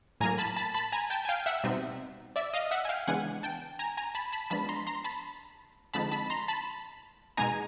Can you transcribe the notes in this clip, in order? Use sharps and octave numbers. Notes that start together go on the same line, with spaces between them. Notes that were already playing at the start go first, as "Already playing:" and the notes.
A2 F#3 A#3 G#5 A#5
A5 B5
A5 B5
A5 B5
G#5 A#5
G5 A5
G#5
F5 G5
E5 F#5
B2 G3 C4 D#4
D5 E5
D#5 F5
E5 F#5
G#5
F5 G5
C#3 E3 G#3 B3 D4 F#5 G#5
G5 A5
G#5 A#5
G#5 A#5
A5 B5
A5 B5
F3 G#3 B3 D4 A5 B5
A#5 C6
A#5 C6
A5 B5
D3 F3 G#3 C4 D#4 A5 B5
A5 B5
A#5 C6
A5 B5
B2 G#3 B3 D#4 G#5 A#5